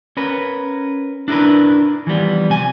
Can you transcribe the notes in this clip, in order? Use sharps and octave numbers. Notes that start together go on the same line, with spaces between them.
C#4 A#4 B4
D4 E4 G#4 A#4 B4
E3 F3 G3 B3
C3 G#5